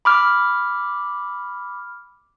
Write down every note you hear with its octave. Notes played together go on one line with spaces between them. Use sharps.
B5 D6 F6